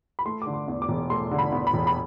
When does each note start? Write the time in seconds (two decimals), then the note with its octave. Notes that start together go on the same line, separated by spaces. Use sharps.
0.19 B5
0.26 A3 C6
0.42 D3 D6
0.53 C6
0.68 E2
0.82 D6
0.89 E1
1.10 A3 C6
1.31 D3
1.38 B5
1.52 E2
1.67 B5
1.74 E1
1.87 B5